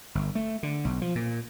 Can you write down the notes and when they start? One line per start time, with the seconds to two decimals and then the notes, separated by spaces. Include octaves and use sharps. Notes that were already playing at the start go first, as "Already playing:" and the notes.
0.15 G1
0.35 A3
0.63 D3
0.85 B1
1.02 F3
1.15 A#2